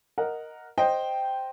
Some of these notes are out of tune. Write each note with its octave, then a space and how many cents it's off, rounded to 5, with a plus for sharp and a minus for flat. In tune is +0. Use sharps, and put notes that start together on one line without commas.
A#4 +0 D#5 +0 F#5 -5
C5 +0 D#5 -5 G5 -5